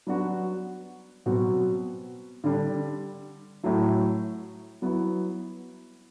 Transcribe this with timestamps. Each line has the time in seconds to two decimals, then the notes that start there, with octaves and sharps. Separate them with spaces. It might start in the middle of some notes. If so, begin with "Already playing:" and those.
0.07 F#3 B3 D4 F#4
1.26 B2 F#3 C4 F#4
2.44 D3 G3 D4
3.63 A2 F#3 A3
4.82 F#3 B3 E4